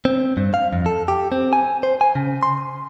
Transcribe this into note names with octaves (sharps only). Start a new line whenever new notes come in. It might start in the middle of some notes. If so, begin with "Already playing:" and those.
C4
G2
F5
F2
A4
G4
C4
G#5
C5
G#5
C#3
C6